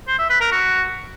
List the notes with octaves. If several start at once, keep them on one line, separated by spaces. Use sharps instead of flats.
C5
E5
B4
A#4
F#4